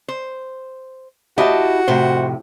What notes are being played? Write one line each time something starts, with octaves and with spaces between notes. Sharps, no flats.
C5
E4 F#4 G4 D#5 A5
F2 A2 C3 C5